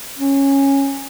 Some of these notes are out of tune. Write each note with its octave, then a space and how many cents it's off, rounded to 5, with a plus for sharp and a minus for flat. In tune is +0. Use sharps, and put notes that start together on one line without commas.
C#4 -10